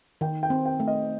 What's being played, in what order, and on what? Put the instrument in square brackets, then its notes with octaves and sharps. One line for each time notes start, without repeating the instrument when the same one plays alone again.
[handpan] D#3 [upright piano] G5
[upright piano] G5
[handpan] C4
[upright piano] G5
[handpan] A3
[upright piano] D#5